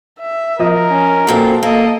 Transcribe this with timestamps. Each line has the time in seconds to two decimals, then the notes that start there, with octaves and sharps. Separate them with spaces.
0.20 E5
0.59 F3 A#4 D#5 D#6
0.89 C#4
1.27 F#2 A#2 C4 A4
1.63 A#3 A4 D#5